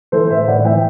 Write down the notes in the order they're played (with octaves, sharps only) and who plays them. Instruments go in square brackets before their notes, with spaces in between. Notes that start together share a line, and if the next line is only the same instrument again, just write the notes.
[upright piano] E3 A4 C5
A2 C5 E5
A2 D5 F#5
E3 E5 G5